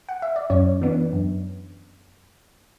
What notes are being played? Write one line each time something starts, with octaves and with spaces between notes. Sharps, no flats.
F#5
E5
D5
F#2 C#4 C#5
E3 B3 D4
F#2